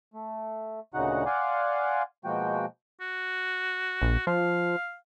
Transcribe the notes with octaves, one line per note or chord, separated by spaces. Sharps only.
A3
D2 A#2 C#3 D#4 F#4 F#5
D5 F5 F#5 G#5 C6 D6
B2 F3 G#3 A#3 F#4 G5
F#4
A#1
F3 F5